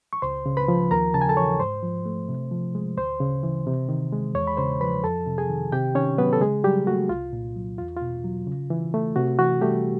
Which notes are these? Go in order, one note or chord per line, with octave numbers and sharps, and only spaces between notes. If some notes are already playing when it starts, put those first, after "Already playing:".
C#6
C#2 C5 C6
C#3
B4 B5
F3
D#2 A#4 A#5
C#3 A5
G#5
A4 A5
E3 C#5 C#6
G#2 C5 C6
F3
A3
C3
F3
G#3
D2 C5 C6
C#3
E3
C3
D#3
G#3
E2 C#5 C#6
B5
C#3 C5 C6
F3 B4 B5
F2 A4 A5
C3
G#4 G#5
D#3
C3 G4 G5
D#3 C#4 C#5
F#3 B3 B4
A4
C#3 G#3 G#4
F#3 G3 G4
A3 F#4
C2 F4
A#2
F#3
E2 F4
F4
B2
F#3
C#3
E3
A3
C3 F#4
E3 F#4
G3 A3 G4